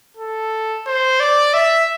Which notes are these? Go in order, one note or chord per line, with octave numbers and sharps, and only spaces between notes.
A4
C5
D5
E5